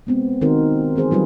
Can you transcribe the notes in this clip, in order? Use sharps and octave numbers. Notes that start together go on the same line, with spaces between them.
G#3 B3 C4
D#3 C4 D#4 F#4 A#4 C5
E3 C4 G#4 C5
F#3 G3 F4 B4